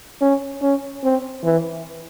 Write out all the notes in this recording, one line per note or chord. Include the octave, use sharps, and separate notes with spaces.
C#4
C#4
C4
E3